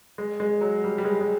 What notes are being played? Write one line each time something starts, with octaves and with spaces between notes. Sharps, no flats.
G#3
G#3
F#3
G3
G3
G#3
G#3